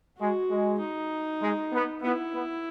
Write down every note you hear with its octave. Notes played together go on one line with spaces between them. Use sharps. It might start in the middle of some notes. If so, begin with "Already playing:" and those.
G#3 F#4
G#3
D#4
G#3
B3
B3 E4
B3